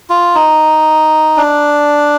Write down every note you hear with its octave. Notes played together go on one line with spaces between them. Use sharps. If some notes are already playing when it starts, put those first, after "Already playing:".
F4
D#4
D4